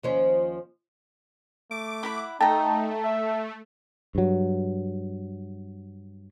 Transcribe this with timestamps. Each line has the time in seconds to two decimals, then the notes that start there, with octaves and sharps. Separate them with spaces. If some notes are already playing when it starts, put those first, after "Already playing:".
0.03 D#2 F3 C#4
1.71 A3 D6
2.03 E4 F#5 B5
2.41 A3 D#4 G5 A5 A#5
3.04 E5
4.15 G2 F#3